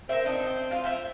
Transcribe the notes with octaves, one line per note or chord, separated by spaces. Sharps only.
C4 A#4 E5
D4 D#4
G5
F4 F5
C5 E5 G5